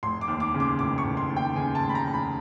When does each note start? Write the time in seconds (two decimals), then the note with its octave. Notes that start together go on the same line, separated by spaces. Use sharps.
0.03 F1 C6
0.21 D6
0.28 D#2
0.40 D6
0.54 C#3
0.60 D6
0.79 F1 D6
0.98 C#6
1.05 F1
1.17 C6
1.30 D#2
1.36 G5
1.56 C#3 G#5
1.75 A5
1.82 F1
1.89 B5
1.95 A#5
2.07 F1
2.14 B5